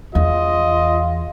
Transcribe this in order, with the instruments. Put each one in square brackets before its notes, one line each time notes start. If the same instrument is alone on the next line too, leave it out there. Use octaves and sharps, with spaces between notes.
[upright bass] E2 [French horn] F4 [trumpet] D#5